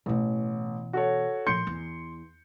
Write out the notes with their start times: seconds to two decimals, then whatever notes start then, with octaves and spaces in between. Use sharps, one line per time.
0.06 A1 B2 E3
0.93 F#4 A4 C#5
1.47 A#2 F3 C6 G6 C#7
1.67 E2